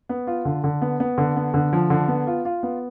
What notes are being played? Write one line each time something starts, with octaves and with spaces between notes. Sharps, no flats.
B3
F4
D3
D3
B3
B3
D3
B3
D3
F3
D3
B3
F4
F4
B3